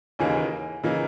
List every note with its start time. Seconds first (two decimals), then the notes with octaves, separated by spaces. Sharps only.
0.19 D#2 C#3 E3 A#3 D#4 G#5
0.84 C#3 E3 A#3 D#4